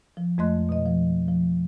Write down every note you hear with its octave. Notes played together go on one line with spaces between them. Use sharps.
F3
F2 G#3 A3 D#5 C6 F#6
B2 D#5
F3
F3